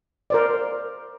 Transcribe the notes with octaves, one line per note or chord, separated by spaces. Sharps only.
A#4 C5 D5